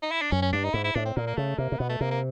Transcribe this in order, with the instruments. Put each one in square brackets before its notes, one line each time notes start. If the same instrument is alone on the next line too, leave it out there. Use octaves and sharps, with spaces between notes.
[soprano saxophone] D#4
E4
D4
[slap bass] F#2 [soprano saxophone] C#4
[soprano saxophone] C#4
[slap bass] G2 [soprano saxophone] D4
[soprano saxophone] D#4
[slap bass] G#2 [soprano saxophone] E4
[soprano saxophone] E4
[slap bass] A2 [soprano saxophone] D4
[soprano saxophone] C4
[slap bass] A#2 [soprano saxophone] A#3
[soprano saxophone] A#3
[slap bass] C#3 [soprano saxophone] A3
[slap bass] C3 [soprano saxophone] A#3
[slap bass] C3
[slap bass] B2 [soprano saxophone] B3
[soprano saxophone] A3
[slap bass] C3 [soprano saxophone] A#3
[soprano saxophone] A#3